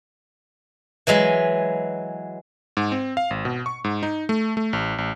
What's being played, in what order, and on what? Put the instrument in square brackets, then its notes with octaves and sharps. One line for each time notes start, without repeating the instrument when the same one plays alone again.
[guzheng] E3 F#3 G#3 B4
[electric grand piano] G#2
C4
F5
G#1
B2
C#6
G#2
D#4
A3
A3
A1
A1